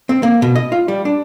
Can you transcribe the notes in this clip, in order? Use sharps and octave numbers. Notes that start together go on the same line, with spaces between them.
C4
A#3
B2
D#5
F4
G3
D4